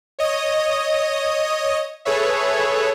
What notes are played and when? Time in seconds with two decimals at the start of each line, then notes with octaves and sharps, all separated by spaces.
0.19 C#5 D#5 D#6
2.05 G#4 A4 B4 C#5 E5